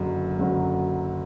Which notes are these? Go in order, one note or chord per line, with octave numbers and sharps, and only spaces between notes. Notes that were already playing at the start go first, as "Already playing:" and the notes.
Already playing: F#1 F#2 D3 F#3
F#1 F#2 D3 F#3